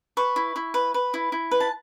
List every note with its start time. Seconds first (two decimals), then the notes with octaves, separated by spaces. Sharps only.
0.17 B4 C#6
0.36 E4
0.56 E4
0.74 B4
0.94 B4
1.14 E4
1.32 E4
1.51 B4
1.60 A5